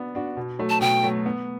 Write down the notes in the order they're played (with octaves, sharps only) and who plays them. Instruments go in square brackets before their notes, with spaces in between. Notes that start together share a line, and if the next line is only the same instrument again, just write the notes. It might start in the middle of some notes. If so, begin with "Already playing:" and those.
Already playing: [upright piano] B3 D4 F#4
D4 F#4
B2
F#3 A3
[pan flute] A5
[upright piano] B2 [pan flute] G5
[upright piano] F#3 A3
B3